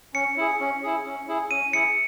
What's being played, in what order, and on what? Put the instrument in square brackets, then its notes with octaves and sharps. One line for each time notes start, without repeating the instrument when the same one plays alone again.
[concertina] C#4 [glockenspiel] C#7
[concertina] E4 G#4
C#4
E4 G#4
C#4
E4 G#4
[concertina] C#4 [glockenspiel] D#7
[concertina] E4 G#4 [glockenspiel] C#7